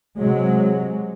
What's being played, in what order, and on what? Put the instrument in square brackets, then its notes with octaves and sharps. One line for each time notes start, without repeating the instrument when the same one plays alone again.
[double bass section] C3 F#3 G#3